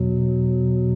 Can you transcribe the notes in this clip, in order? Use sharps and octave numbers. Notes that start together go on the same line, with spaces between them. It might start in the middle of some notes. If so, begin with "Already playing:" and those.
Already playing: E2 B2 F#3